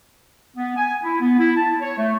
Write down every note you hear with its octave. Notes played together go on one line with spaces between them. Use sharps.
B3
G#5
E4
B3
E4
A5
C#5
A3